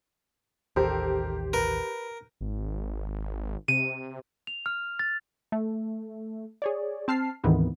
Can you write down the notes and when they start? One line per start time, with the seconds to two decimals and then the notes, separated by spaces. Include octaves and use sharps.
0.76 A1 D#2 G4 A4 A#4 C5
1.53 A#4 B4
2.41 G#1
3.68 C3 D#7
4.47 F7
4.66 F6
4.99 A6
5.52 A3
6.62 G#4 C#5 D5
7.08 C4 A5 F6 C7
7.44 D2 G#2 D#3 E3 B3 C4